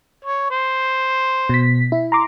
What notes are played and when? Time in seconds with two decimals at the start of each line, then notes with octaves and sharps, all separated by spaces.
0.25 C#5
0.50 C5
1.49 B2 B6
1.92 E4
2.12 A#5 C6 D6